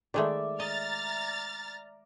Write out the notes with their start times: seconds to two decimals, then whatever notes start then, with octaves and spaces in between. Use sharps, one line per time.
0.14 D#3 G#3 A3 D5 E5
0.60 D#5 A#5 F6 A6